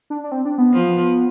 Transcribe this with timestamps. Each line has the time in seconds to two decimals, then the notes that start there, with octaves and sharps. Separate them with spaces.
0.10 D4
0.24 D4
0.32 C4
0.45 D4
0.58 B3
0.73 F3